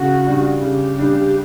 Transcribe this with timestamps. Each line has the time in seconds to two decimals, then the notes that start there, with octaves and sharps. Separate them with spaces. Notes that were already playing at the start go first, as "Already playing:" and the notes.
Already playing: C#3 F#4
0.26 G3 D4
0.62 C#3 G4
0.99 G3 D4